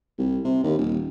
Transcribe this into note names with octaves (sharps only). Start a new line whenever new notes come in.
C2
C3
D#2
D#1